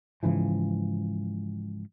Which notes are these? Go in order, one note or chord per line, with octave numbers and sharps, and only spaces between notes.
G#2 C#3 E3 F3